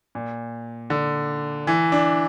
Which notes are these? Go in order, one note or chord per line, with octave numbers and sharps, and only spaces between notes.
A#2
D3
E3
D4